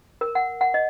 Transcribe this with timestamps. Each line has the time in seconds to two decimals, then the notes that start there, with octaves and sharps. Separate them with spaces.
0.21 A#4
0.35 F#5
0.61 F#5
0.74 D#5